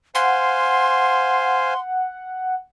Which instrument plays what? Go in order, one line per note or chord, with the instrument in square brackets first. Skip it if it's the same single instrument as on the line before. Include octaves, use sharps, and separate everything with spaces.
[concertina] C5 F5 G#5 [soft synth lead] F#5 [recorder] C6